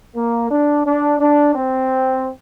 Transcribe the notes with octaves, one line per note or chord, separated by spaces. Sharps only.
A#3
D4
D4
D4
C4